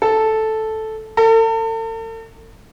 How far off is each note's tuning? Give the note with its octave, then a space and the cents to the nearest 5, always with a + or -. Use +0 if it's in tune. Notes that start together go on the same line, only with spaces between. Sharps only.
A4 -5
A4 +40